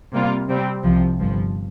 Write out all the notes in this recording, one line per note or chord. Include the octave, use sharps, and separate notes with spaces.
C3 G3 A#3 F4
C3 G3 C4
C2 C3 F3
G1 G2 F3